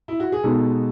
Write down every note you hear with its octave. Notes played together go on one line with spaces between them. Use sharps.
E4
F#4
G#4
B2 G#3 B3 D#4 A4